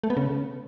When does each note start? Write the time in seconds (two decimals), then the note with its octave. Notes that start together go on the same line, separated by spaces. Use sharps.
0.04 A3
0.10 B3
0.17 C#3